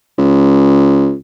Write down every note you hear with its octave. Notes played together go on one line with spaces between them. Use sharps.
C#2